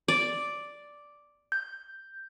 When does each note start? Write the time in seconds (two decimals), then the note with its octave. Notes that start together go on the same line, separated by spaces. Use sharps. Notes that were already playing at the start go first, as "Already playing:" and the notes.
0.08 D5
1.52 G6